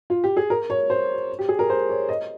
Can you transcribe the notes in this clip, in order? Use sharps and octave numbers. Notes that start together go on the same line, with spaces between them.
F4
G4
G#4
A#4
C#5
C5
G4
G#4
A#4
C5
C#5
D#5